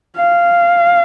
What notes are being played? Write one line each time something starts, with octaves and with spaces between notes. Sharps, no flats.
F5